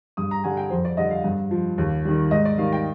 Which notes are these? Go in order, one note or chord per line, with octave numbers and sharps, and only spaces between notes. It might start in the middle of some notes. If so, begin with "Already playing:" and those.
G2 D#6
A#5
D3 G3 G#5
G5
F2 C5
D5
D3 G3 D#5
F5
G2
F3
D#2
D#3 G3
G#2 D#5
D5
D#3 G3 F5
G5